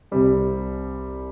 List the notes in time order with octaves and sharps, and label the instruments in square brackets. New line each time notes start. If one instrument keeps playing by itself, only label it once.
[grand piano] C2 C3 G3 C4